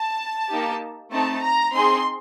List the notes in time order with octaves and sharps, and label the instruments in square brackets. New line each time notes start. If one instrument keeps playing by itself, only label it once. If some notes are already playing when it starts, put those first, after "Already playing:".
Already playing: [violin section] A5
A#3 D#4 G4
A3 C4 D#4 A5
A#5
C4 D#4 G#4 C6